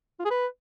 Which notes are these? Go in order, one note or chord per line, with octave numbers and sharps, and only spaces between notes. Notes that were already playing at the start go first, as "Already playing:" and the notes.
F4
G#4
B4